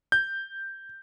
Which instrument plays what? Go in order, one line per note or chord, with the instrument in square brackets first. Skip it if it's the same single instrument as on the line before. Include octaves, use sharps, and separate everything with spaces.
[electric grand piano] G6